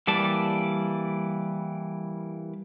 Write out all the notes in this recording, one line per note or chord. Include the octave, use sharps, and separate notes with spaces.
E3 G3 A#3 D5 A5